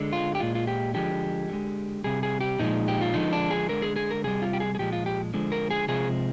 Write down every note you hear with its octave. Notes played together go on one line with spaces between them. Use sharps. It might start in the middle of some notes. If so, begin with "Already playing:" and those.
Already playing: D3 G#3
F4
G4
A#2 G#3 F4
F4
G4
D3 F3 G#3 G4
D3 G#3
C3 G3 G#4
G#4
G4
A#2 F3 G#3 D#4
G4
F4
D3 F3 G#3 D#4
D4
G#4
D3 G#3 A#4
G#4
G#4
A#4
C3 G3 G#4
F4
G4
G#4
G#4
A#2 F3 G#3 G4
F4
G4
D3 F3 G#3
A#4
G#4
C3 F3 G#3 G#4